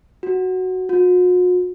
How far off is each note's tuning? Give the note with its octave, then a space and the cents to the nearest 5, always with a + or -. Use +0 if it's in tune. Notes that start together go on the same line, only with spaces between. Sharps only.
F#4 +0
F#4 -45